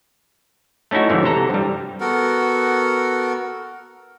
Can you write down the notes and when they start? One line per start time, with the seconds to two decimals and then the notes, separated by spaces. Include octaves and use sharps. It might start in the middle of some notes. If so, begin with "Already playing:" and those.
0.91 A3 C#4 D#4 E4 F#4
1.09 F2 G#2 D3 E3
1.23 C3 E3 A4 A#5
1.50 G2 G3
2.00 B3 F#4 A4 A#4